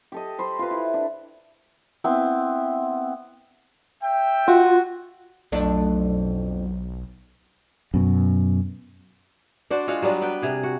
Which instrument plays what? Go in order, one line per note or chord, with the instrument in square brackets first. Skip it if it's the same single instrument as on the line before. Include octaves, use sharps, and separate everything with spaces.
[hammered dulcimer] G4 A4 D#5
C5 B5 C6
F4 B4
E4
D4
[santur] B3 C4 E4
[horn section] E5 G5
[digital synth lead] F4 [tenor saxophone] F#4
[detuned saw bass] B1 [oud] F2 A3 D4 [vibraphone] F#3
[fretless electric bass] F#2 B2
[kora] D4 F#4 C5 D5
G#3 F4 F#4 F5
F#3 G3 B3 D4
B3 B4 G5
C3 G#4
F#4